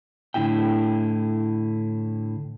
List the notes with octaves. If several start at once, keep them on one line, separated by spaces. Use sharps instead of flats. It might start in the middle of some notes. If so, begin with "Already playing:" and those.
A2 D3 D#4 E4 G5